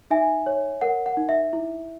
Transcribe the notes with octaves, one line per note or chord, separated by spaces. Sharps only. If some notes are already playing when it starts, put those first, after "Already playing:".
D#4 E5 G#5
C#5
A#4 F#5
F#5
D#4
E5
E4